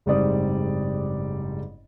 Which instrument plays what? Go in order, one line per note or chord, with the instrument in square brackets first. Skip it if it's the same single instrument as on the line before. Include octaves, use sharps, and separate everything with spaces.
[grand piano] F#1 G#2 G3 C4 D5 D#6